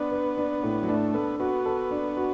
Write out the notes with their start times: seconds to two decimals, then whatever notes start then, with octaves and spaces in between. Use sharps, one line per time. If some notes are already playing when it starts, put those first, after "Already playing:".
Already playing: B3 D4
0.12 B4
0.37 D4
0.63 A2
0.83 F#3
0.88 A3 D4
1.14 B3 A4
1.40 B3 F#4
1.66 A4
1.91 D4
2.17 F#4